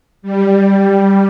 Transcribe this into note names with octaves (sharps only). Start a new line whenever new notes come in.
G3